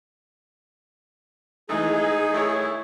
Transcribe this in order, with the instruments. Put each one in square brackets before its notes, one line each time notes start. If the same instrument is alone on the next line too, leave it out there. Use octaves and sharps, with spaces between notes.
[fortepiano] E3 G#3 A3 [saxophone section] D#4 [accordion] G#4
[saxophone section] D#2 E4 [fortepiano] A3 C#5